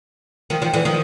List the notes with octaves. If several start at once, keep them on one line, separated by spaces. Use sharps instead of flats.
D#3 F3
D#3 F3
D3 E3
D#3 F3